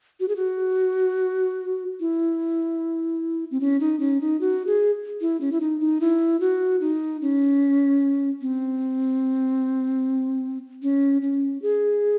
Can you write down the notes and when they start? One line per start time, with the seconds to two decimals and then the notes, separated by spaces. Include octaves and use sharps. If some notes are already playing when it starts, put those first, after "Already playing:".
0.20 F#4
0.28 G#4
0.36 F#4
2.00 E4
3.51 C4
3.61 C#4
3.80 D#4
4.00 C#4
4.21 D#4
4.41 F#4
4.67 G#4
5.21 E4
5.41 C#4
5.52 E4
5.61 D#4
5.80 D#4
6.01 E4
6.40 F#4
6.81 D#4
7.22 C#4
8.42 C4
10.82 C#4
11.22 C#4
11.62 G#4